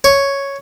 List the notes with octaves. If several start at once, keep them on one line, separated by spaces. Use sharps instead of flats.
C#5